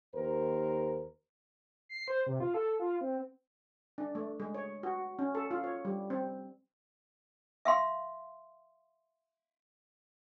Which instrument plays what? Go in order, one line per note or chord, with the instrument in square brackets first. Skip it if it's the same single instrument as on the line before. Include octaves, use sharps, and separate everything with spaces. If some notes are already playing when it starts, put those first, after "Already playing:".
[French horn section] D#2 A#4 C5
[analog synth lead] C7
C5
C3
F4
A4
F4
C4
[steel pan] D4
A3
G#3
C#5
F#4
C#4
A4
F4
C#5
G3
C4
[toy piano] E5 F5 C6